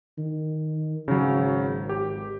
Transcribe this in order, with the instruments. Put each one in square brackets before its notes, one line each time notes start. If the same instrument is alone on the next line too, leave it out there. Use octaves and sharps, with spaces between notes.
[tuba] D#3
[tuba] G#1 [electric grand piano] C#3 F#3
[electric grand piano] G4